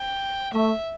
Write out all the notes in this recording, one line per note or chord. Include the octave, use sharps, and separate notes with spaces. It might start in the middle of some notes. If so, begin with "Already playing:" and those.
Already playing: G5
A3 E5